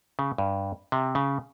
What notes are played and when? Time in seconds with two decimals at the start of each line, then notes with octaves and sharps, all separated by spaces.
0.19 C#3
0.38 G2
0.92 C3
1.15 C#3